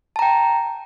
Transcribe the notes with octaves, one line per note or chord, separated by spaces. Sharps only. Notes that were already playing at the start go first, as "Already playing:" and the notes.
G5 A5 A#5